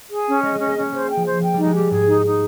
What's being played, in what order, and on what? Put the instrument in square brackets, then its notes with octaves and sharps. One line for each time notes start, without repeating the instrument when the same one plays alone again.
[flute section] G#4
C#4
[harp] G#3 [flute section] D#5
[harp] G#3 [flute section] C#4
[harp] A#3
[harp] G#3 [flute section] C#4
[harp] G#3 [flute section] C5
[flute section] G5
[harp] F3
[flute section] C5
[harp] F3 [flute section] G5
[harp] G3 [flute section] D#4
[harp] G#3
[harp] G3 [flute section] G4
[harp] G#2 [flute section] G#4
[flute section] D#4
D#4